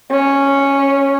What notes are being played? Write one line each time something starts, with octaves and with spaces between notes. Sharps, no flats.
C#4